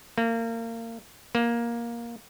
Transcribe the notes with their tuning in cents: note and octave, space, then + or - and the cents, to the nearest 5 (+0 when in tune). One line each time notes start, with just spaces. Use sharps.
A#3 -30
A#3 +10